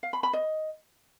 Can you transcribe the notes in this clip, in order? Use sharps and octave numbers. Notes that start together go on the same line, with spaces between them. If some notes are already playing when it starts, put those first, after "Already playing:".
F5
B5
B5
D#5